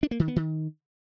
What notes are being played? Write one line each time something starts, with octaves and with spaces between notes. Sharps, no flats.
D4
A#3
D#3
B3
D#3